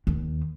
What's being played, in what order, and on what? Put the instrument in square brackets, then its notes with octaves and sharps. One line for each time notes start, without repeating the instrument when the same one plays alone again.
[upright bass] D#2